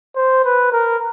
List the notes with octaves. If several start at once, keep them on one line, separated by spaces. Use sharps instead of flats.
C5
B4
A#4